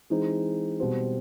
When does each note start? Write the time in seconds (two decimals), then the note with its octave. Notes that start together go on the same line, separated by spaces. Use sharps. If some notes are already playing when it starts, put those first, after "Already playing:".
0.10 E3 G#3 C4 D#4
0.80 B2 G3 C4